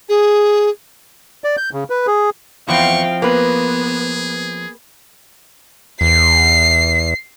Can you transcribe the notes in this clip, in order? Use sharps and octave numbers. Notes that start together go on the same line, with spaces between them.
G#4
D5
G6
C#3
B4
G#4
E2 F3 C4 F5 G5 C#6
A#3 B3 G#4 B4
E2 C7